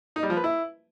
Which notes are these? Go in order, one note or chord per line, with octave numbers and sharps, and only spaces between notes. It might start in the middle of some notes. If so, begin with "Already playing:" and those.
D#4
G3
F3
B4
E4